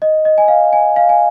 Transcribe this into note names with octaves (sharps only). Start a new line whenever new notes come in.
D#5
D#5
G#5
F5
G#5
F5
G#5